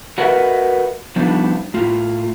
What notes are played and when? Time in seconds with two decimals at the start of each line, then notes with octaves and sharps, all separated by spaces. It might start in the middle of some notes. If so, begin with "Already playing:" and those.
0.18 F#4 A#4 B4 D#5 E5 F#5
1.16 F3 G3 B3 D4 D#4
1.74 A2 F4